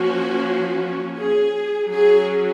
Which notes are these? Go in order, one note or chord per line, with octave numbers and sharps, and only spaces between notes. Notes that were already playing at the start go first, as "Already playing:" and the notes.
Already playing: F3 A#3 C#4 F#4
G#4
F#3 C#4 G#4